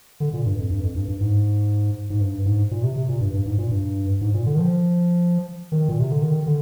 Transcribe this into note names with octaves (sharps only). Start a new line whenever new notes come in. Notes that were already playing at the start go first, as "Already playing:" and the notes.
D3
A#2
G2
F2
G2
F2
G2
G2
G#2
G#2
G2
G#2
A#2
C3
C3
A#2
G2
G2
G#2
A#2
G2
G#2
A#2
D3
D#3
F3
D#3
A#2
C3
D3
D#3
D3